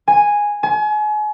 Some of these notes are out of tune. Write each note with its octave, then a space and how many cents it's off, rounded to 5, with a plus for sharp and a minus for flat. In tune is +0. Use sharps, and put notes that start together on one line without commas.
G#5 -5
G#5 +35